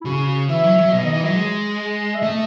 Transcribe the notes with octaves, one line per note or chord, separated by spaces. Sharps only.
E4
C#3 F#4
E3 E5
F#3
F#3
B2 D#5
D#3 D#5
E3
F#3 D#5
G#3
E5
A3 D#5